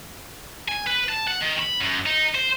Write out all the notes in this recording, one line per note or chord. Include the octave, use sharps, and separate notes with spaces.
G#5
B4
A5
F#5
D#3
B5
F#2
D#4
C5